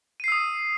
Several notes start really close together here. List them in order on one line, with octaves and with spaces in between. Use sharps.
D#7 C7 E6 D#6